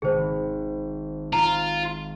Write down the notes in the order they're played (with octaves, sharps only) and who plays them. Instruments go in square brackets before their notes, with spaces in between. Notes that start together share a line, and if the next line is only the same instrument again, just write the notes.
[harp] G#1 [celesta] G#4 C5
[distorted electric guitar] F4 [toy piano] A#5